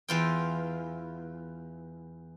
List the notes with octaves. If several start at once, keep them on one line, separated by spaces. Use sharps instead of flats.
E2 F4 G5